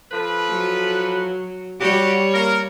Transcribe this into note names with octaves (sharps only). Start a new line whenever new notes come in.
F3 A4 B4
F#3
G3 F#4 G4 C#5
A#3 A#4